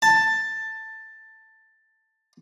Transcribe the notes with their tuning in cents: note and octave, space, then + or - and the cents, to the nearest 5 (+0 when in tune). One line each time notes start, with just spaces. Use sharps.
A5 +10